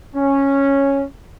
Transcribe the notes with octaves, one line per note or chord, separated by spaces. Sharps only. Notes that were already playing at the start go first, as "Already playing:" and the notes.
C#4